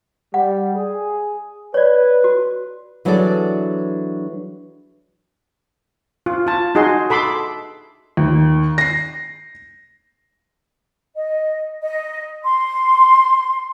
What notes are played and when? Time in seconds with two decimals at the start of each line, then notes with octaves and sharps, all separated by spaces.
0.34 G3 F#5
0.75 G#4
1.74 B4 C#5 D5
2.24 F#4
3.05 E3 F#3 D4 G#4 A4 D5
6.26 F4
6.47 F4 A5
6.75 D#4 F#4 G#4 D#5 C6
7.10 A4 B5 C6 D6
8.17 D#2
8.78 A#6 C7
11.16 D#5
11.82 D#5
12.43 C6